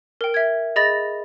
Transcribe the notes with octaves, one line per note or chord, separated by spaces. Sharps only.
A#4 G5
E5 G#6
G#4 D#5 B5 A6 A#6